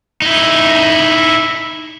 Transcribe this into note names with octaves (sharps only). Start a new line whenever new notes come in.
D#4 E4